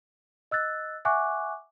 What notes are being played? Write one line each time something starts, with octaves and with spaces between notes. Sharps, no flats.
D#5 E6 F#6 A6
E5 F#5 G#5 C#6 D6 F#6